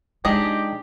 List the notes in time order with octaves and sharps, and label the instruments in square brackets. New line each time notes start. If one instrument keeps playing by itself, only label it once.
[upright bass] G#3 F4 [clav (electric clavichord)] D4 D#4 G#5 [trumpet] G4 [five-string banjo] G#4 D#5